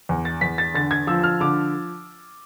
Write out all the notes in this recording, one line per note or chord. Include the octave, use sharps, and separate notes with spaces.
E2
A6
E2 B6
A6
D3 A6
G#6
F3 E6
F6
D3 D6